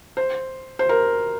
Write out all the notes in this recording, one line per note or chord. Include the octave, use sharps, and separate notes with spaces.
C5
C5
A#4